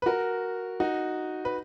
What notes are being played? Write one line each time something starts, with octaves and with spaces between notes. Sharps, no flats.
B4
F#4 A#4
D#4 F#4
B4